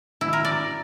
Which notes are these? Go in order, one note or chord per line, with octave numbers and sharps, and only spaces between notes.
E4
A#4
D5